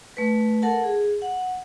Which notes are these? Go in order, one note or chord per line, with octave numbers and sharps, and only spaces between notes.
A3 B4
A4 A#4 F#5 A5
G#4
F#5